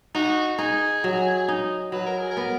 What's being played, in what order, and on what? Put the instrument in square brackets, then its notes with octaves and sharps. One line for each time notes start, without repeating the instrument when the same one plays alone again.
[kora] D#4 [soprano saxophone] F#4
[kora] D#4 [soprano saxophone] G#4
[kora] F#3
D#4
[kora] F#3 [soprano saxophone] B4
[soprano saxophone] A#4
G#4
A#4
[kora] B3